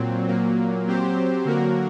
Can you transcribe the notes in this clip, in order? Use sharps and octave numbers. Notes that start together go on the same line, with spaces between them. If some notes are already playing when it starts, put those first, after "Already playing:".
Already playing: A#2 F#3 C4
A#2 F#3 A#3
F#3 C4 G4 C5
D3 F#3 A#3 F#4 A#4